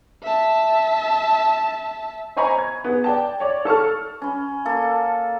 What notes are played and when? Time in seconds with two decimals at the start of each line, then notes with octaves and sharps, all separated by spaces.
0.23 E5 A5
2.37 C5 D#5 G#5 A#5 B5 C#6
2.58 G#6
2.84 B3 G#4
3.04 D5 G5 A5
3.40 C#5 D5
3.65 A4 A5 C#6 F6
4.22 C#4 B5
4.65 A#3 A4